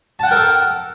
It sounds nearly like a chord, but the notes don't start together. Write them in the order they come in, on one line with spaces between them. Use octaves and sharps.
A5 F#5 G5 A#4 A4